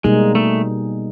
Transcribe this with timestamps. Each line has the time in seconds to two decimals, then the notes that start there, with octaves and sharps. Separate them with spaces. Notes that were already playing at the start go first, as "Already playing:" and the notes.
0.04 B2 G3 G#3 A#3 D#4 G#4
0.35 A3